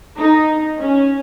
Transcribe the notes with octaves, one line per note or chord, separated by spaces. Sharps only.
D#4
C#4